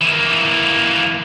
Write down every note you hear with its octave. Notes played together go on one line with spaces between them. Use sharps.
E3 A#3